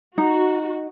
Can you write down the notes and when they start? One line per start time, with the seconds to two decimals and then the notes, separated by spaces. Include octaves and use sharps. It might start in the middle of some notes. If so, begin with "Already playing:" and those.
0.18 D#4 F#4